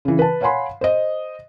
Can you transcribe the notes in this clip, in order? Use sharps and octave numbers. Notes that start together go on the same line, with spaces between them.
C#3 E3
B4 A5
C#5 F5 F#5 G#5 B5 C6
C5 D#5